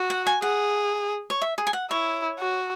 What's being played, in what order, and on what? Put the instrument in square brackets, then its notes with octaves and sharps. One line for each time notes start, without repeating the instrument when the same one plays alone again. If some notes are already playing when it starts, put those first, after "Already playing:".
Already playing: [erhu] F#4
[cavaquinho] F#5
G#5
[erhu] G#4 [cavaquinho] F#5
[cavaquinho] C#5
E5
G#4
G#5
F#5
[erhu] E4 [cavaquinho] C#5
[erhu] F#4